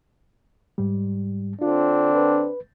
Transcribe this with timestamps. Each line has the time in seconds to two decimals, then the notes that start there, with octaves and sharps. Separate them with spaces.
0.78 G#2 G3
1.61 D3 C4 D4 F4
2.15 B4